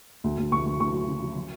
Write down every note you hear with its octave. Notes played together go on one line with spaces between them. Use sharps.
D2
D2
D2 C#6
D2
D2 C#6
F#3
C#3
F#3
F#3